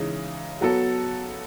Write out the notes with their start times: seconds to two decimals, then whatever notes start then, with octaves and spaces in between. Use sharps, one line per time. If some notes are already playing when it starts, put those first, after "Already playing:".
Already playing: C#3 E3 G#3 D#4
0.61 F#3 B3 F#4 A4